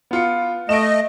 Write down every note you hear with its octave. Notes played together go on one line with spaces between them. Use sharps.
B3 F4 C#7
A3 D#5 D7 E7